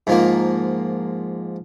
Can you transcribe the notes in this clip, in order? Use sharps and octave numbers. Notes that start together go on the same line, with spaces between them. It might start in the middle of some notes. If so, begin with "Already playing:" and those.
G#2 F3 A#3